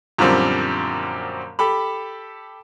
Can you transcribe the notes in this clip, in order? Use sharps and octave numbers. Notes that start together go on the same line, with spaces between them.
F#2 A#2 D3 F3 G3 C4
G4 A4 B5